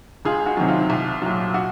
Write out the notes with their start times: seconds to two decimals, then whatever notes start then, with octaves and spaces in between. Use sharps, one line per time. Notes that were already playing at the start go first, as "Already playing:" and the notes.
0.25 C#2 F4 G#4
0.46 F#4
0.57 C3 D#3 F#3
0.68 F4
0.90 C2
1.22 A#2 F#3
1.54 F#4